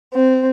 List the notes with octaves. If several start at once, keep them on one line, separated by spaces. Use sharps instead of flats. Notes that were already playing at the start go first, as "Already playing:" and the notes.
C4